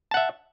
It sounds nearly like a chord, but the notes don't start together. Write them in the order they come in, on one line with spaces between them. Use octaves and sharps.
A5 F#5 E5